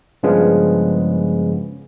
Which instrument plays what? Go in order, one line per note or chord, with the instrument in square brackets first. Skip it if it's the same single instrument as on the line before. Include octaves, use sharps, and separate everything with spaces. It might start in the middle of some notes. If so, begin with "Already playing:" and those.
[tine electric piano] G2 C#3 F3 G#3 B3 C#4